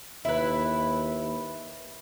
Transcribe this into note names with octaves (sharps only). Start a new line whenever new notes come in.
D#2 E4 B4